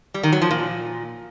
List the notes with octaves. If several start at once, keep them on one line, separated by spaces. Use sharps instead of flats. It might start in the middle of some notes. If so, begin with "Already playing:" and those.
G3
D#3
F#3
F3
A#2